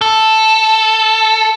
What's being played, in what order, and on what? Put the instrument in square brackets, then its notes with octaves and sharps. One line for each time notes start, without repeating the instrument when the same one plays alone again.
[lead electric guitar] A4